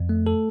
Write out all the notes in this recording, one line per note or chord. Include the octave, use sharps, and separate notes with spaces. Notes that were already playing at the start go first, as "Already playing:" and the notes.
Already playing: F2
A3
A4